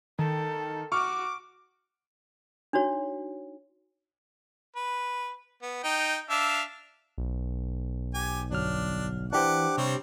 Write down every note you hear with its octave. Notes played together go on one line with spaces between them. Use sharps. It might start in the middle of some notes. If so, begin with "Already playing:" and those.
D#3 A4
F#4 C#6 D6 F6
D4 D#4 F#4 C#5
B4
B3
D#4 G5
D4 E5 F5
B1
G4 G#5
G1 F#3 D4 F6
E3 D4 G4 C5 F#5 D6
C3 G3 C4 C#5